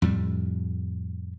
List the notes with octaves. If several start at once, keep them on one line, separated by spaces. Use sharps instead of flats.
F2 A2 G3